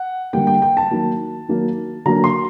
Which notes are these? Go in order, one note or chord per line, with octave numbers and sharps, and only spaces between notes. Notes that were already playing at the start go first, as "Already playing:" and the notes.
Already playing: F#5
D3 G3 A#3 G5
G5
G5
A5
D#3 F#3 A#3
D#3 F#3 A#3
D3 F#3 A#3 A#5
C6